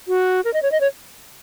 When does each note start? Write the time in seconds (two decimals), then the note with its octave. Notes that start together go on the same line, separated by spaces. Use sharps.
0.08 F#4
0.45 A#4
0.54 D#5
0.63 C#5
0.72 D#5
0.81 C#5